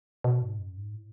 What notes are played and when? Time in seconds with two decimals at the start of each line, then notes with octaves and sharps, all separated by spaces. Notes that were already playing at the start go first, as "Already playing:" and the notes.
0.24 B2
0.42 G#2
0.59 F#2
0.77 G#2
0.94 A2